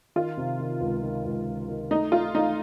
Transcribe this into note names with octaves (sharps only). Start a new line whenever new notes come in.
D#3 F4
C3
D#3
C#2
D#3
C#2
C#2
D#3
A3 D#4
A3 F4
A3 D#4